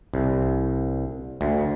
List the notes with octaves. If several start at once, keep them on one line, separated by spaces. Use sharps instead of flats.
C2
D2